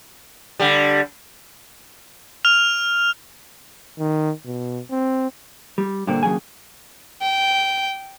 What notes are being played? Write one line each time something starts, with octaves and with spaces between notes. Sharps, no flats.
D3 G3
F6 F7
D#3
B2
C4
G3
G2 A#2 D3 A#3 C4
D#2 C#3 F#3 D4 G#4 G#5
G5